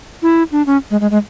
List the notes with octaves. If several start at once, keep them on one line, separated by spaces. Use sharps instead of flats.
E4
D4
C#4
G#3
G#3
G#3